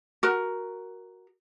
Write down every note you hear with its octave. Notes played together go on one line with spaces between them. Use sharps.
F#4 A#4